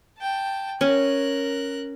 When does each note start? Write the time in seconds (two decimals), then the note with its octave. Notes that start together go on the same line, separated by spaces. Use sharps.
0.19 G5 A5
0.81 C#4 A#4 F#6